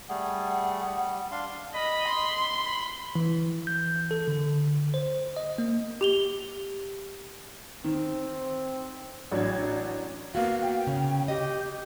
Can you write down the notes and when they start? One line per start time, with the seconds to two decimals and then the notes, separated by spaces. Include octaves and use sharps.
0.09 G3 A3 G#4 F#5
0.85 G3
1.31 D4 F5 C6
1.75 D#5 B5
2.08 C6
2.65 B5
3.15 E3
3.67 G6
4.11 A4
4.28 D3
4.94 C5
5.37 D#5
5.58 A#3
6.01 G4 F7 G7
7.84 D#3 C4
9.32 A1 F#3 D4 G#6
10.35 A#3 B3 F#4 F5
10.62 G5
10.87 C#3
11.28 G4 D#5